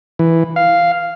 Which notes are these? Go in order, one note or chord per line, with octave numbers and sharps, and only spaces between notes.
E3
F5